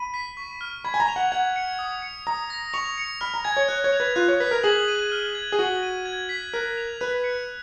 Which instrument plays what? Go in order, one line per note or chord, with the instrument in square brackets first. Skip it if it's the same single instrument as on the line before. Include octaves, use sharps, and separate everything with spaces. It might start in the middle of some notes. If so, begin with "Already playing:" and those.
Already playing: [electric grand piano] B5 [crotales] D#7
[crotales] B6
C#6
F6
[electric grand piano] B5 [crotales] G#6
[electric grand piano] G#5
A#5
[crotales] F7
[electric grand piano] F#5
[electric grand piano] F#5 [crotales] G#6
[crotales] C#7
D#6
C#7
[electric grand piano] A#5 [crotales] D#6
[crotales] A#6
[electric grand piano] C#6 [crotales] F7
[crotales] C#7
[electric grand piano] B5 [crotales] F6
[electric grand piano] A#5
[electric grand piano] G#5 [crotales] G#6
[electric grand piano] C#5
[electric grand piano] C#5 [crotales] F#6
[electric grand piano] C#5
[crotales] F7
[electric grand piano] B4
[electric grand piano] F4 [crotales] F#6
[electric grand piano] C#5
[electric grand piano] B4 [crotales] B6
[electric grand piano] A#4
[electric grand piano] G#4 [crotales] F#7
[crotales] D#7
F6
G#6
[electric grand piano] G#4
[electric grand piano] F#4 [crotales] F#7
[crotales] D#7
G#6
B6
[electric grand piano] A#4 [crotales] F#6
[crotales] F7
[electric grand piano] B4 [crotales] F#6
[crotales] C#7